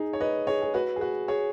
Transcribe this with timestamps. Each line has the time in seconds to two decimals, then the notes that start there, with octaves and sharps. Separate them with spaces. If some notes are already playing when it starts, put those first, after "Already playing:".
Already playing: D#4 G#4
0.13 C#5
0.20 B4 D#5
0.47 G#4 C#5
0.62 G#4
0.74 F#4 B4
0.96 G#4
1.01 F#4 B4
1.28 G#4 C#5